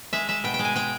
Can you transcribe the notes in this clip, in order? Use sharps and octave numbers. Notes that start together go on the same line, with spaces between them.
G#3 E5
G#3 E5
B2 G5
G5
G#3
G#5
G#3 G5